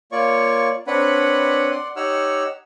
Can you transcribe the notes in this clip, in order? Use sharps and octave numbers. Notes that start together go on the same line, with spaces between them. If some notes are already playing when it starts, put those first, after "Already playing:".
A#3 F4 C#5 D5 C#6
C4 D4 B4 C#5 F#5 B5
D5 F#5 C6
D#4 G4 C#5 F#5 E6 F6